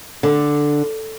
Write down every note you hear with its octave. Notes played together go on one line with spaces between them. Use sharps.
D3